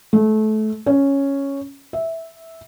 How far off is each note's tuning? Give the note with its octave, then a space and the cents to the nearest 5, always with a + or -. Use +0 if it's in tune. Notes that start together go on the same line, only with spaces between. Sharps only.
A3 -25
C#4 +0
E5 -10